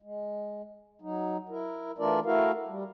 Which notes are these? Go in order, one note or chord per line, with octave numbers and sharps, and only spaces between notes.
G#3
F#3 D#4
E4 A#4
E3 A3 D4 F4 A#4 D5
A3 E4 F#4 A#4 F5
G3